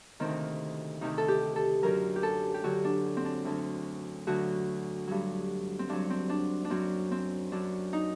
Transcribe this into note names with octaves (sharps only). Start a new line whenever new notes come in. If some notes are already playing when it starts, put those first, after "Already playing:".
D2 C3 D#3 C4
D2 C3 D#3 D#4
A4
G4
A4
F#2 D3 F#3 A#4
G4
A4
G4
F#2 D3 F#3 F#4
D4
C4
D4
D2 D3 F#3
D2 D3 F#3 F#4
G2 F#3
C4
G2 F#3 D4
C4
D4
D4
F#2 F#3 C4
C4
F#2 F#3 D4
D#4